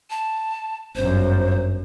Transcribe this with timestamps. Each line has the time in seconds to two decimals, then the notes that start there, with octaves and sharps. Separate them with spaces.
0.10 A5
0.96 G1 F#2 C5